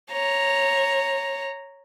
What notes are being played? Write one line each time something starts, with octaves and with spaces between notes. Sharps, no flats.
C#5 A#5